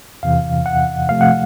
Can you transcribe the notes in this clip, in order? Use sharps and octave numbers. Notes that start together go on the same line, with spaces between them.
E2 C3 E3 F5
F#5
C3 F3 A3 F5
F#5